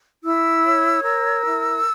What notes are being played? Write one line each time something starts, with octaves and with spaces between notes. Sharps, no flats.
E4 E6
C#5
A#4 E6
E4